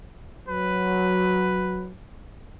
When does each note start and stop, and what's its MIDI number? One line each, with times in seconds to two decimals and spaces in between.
0.49 1.95 54
0.49 1.89 71